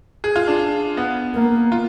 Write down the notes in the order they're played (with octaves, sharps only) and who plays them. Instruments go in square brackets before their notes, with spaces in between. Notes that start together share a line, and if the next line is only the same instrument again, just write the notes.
[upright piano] G#4
F4
D4
B3
[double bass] A#3
[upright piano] F4